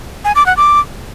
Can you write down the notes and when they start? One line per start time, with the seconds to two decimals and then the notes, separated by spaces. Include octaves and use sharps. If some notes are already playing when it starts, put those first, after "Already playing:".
0.25 G#5
0.35 D6
0.46 F#5
0.57 D6